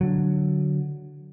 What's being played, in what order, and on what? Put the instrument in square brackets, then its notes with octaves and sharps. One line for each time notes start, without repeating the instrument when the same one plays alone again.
[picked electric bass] D3 F#3